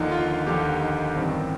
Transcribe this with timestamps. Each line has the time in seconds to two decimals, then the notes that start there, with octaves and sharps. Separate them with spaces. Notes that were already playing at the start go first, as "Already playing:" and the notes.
Already playing: D#2 D3 F3 D#4
0.12 F4
0.46 D#2 D3 F3 G4
0.81 D#4
1.16 A1 G2 D#3 C4